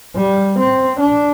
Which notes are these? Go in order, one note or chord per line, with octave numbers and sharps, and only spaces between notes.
G3
C4
D4